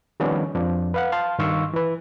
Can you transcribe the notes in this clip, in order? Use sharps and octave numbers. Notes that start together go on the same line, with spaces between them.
D#3 F3 G3 B3 C#4 D4
F2 F3 D4
B4 F5 F#5
F5 A5 C6
G2 D#3 F5 C6 C#6 E6
E3 B4